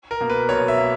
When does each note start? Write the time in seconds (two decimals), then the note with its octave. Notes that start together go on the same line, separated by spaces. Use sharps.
0.11 A#4
0.20 B2 A#3
0.30 B4
0.49 B1 C#5
0.68 E5
0.78 A#3